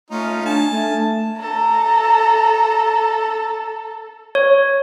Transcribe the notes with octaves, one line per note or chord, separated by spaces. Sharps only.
A3 C#4 D#4 F4
D4 G#5 A5
A3
A4 A#5
C#5